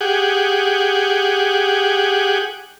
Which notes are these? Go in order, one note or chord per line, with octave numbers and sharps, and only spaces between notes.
G4 G#4 F#5